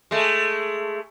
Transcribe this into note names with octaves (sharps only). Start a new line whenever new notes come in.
G#3 A3